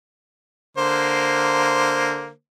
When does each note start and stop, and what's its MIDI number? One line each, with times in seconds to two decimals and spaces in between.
0.77 2.29 50
0.77 2.29 58
0.77 2.29 72